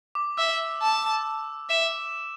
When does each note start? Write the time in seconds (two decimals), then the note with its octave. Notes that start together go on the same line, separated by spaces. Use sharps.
0.15 D6
0.38 E5 E6
0.82 A5
1.70 E5 E7